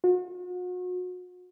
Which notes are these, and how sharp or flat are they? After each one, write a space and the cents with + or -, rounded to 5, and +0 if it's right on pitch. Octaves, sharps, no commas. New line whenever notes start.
F#4 -40